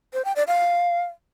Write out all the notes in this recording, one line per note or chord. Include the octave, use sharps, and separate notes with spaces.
C5
G5
D5
F5